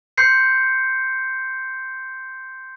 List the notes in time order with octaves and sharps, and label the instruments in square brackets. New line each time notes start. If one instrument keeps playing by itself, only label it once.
[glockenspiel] C6 G6 C7 C#7